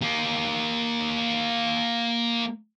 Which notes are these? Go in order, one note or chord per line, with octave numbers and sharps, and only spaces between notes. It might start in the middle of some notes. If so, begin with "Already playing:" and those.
A#3 G4